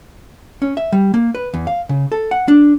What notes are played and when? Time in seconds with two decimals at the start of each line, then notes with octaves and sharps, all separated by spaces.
0.62 C#4
0.77 E5
0.92 G3
1.14 A#3
1.35 B4
1.54 E2
1.67 F5
1.89 C#3
2.12 A4
2.31 F#5
2.48 D4